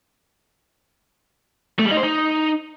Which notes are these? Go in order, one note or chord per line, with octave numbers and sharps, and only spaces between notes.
A3
G3
D#4
C5
D#4